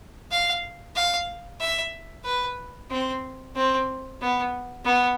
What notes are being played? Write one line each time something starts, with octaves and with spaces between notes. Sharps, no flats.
F5
F5
E5
B4
C4
C4
B3
B3